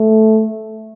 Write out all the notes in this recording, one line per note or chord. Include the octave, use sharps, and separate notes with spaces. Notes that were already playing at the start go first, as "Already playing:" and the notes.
Already playing: A3